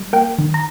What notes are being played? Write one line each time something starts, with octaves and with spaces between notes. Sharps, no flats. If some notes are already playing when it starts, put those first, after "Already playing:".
Already playing: G3
A#3 G5
D#3
A#5